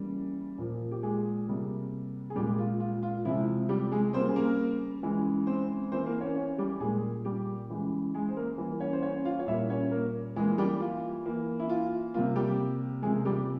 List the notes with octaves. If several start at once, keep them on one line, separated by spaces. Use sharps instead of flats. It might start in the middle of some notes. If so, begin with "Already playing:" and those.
Already playing: C#3 E3 G3 A#3
A#2 F3 A#3
G4
G#3 G#4
C3 G3 A#3
G#4
A#2 G3 G#3 G4
F4
F4
F4
C3 F3 G#3 E4
G3 G4
G#3 G#4
C#3 G3 A#3 C4 C5
G#4
A#3 A#4
C#3 E3 G#3
C4 C5
E3 A#3 C4 C5
A#3 A#4
C#4 C#5
C#4 C#5
G3 G4
A#2 G3 G#3 A#3 G#4
G3 G4
C#3 E3 G#3
G#3 G#4
C5
A#3 A#4
E3 G3 A#3
C#4 C#5
C5
C#4 C#5
F4 F5
C#5
A#2 G3 A#3 E4 E5
C#4 C#5
A#3 A#4
E3 G#3 A#3 G#4
G3 G4
F4
E3 A#3
E4
F4
C3 G3 A#3 F4
G3 G4
C3 F3 G#3 A#3 G#4
G3 G4